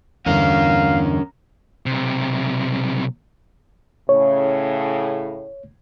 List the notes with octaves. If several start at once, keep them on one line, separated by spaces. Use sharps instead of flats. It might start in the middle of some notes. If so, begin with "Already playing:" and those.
E2 G2 D3 C#4 A#4 F5
B1 C3
A2 C#3 C#5